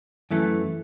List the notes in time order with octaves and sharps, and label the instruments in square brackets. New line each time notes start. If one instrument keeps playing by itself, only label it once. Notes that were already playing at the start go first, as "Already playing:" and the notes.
[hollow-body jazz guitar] F#2 E3 A3